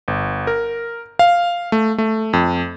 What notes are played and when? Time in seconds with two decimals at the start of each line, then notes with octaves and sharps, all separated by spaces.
0.08 G1
0.47 A#4
1.19 F5
1.72 A3
1.98 A3
2.33 F2